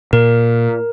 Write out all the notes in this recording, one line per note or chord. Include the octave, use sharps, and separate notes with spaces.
A#2 A#4